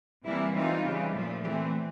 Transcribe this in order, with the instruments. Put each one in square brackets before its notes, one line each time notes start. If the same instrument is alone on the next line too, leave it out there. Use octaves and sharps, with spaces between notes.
[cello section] C3 E3 G3 A#3 E4
E3 G3 C4 D#4 F4
C#3 E3 G3
A#2 F3 A3
E3 A3 C4 G4